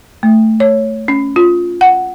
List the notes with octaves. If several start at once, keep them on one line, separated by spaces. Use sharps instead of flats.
A3
C#5
C#4
F4
F#5